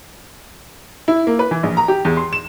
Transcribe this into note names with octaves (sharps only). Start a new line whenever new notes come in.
E4
A#3
B4
E3
A#1
A#5
G4
E2
C6
E7